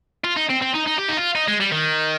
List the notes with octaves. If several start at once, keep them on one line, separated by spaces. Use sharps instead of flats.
F4
D#4
C4
C4
D#4
D#4
G4
D#4
F4
D#4
G#3
G3
D#3